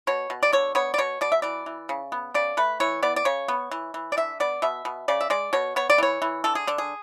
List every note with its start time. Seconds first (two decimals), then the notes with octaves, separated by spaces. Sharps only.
0.07 B2 C#5
0.30 B2
0.43 D5
0.53 D3 C#5
0.75 B3 C#5
0.94 D5
0.98 B2 C#5
1.21 B2 D5
1.32 E5
1.42 E3 D5
1.66 E3
1.89 C#3
2.12 B3
2.34 C#3 D5
2.57 A3 B4
2.80 E3 C#5
3.03 B3 D5
3.16 D5
3.25 C#3 C#5
3.48 B3
3.71 E3
3.94 E3
4.12 D5
4.17 D3 E5
4.40 B3 D5
4.62 B2 E5
4.85 B2
5.08 C#3 D5
5.21 E5
5.30 G#3 D5
5.53 B2 C#5
5.76 B3 C#5
5.90 D5
5.98 E3 C#5
6.22 E3
6.44 D3 A4
6.55 G#4
6.67 D3 D4
6.78 G#4